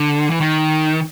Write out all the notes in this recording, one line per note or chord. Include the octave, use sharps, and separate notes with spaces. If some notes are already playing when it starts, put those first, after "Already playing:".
Already playing: D3
E3
D#3